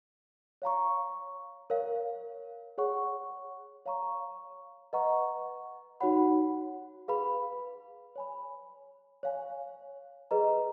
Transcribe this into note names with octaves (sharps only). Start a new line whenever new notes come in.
C#5 F5 A#5 C#6
A#4 C#5 F5
G#4 C#5 F#5 C#6
C#5 F5 A#5 C#6
B4 D#5 F#5 A#5 C#6
D#4 F#4 C#5 F#5 B5
G#4 B4 F5 B5
C#5 G#5 B5
C#5 F5 G#5
G#4 B4 D#5 A#5